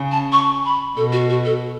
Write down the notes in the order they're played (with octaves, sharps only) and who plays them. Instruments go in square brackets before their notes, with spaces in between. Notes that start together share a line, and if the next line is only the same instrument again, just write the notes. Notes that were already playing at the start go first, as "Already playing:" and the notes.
Already playing: [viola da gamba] C#3
[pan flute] A5
C#6
B5
[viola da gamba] B2 [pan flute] A4
[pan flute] F#4
F#4
A4